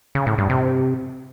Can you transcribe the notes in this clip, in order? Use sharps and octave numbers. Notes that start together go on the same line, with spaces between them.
C#3
A2
G2
C3